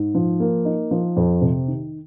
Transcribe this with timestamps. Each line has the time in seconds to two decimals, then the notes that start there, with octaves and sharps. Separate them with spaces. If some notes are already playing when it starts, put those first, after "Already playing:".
Already playing: G#2
0.15 F3
0.40 A#3
0.65 D#4
0.91 F3
1.17 F2
1.41 C3
1.68 D#3